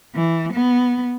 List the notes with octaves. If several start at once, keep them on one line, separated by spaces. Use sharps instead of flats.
E3
B3